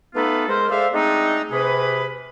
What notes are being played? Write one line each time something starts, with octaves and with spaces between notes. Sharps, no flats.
A3 B3 D#4 F4 A4 B4
G#3 A#4 C5
G#3 A4 C5 D5 E5 F5
G#3 A3 C4 D4 D#4
C3 G#4 B4